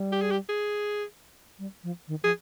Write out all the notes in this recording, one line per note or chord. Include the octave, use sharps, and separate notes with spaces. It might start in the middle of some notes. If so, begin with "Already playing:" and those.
Already playing: G3
G4
G#4
G4
G#4
G3
F3
D#3
F3 G#4